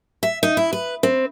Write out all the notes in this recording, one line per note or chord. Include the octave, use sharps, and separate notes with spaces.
E5
D#4
E4
B4
C4